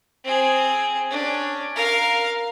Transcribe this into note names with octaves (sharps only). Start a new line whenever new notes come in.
C4 G#4
C#4 D4
A#4 F5